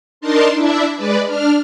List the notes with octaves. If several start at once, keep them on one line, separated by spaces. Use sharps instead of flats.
D4 D#4 A#4 A5 C6
D4 E4 E5
G#3 B4 D5
D4 F6